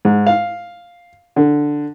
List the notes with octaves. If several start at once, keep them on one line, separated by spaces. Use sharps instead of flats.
G#2
F5
D3